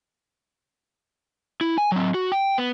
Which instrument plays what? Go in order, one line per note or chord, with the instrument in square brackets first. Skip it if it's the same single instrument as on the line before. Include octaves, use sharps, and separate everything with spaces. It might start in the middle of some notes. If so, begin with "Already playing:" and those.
[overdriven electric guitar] E4
G#5
F#3 C4
F#4
G5
B3